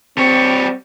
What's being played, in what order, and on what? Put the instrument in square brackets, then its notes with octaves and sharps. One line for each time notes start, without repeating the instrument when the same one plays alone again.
[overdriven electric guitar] G3 C#5 [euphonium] C4